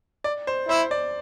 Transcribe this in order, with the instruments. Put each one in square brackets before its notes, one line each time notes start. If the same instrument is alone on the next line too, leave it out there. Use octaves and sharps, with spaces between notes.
[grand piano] D5
C5
[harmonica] E4 [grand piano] C5
[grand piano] D5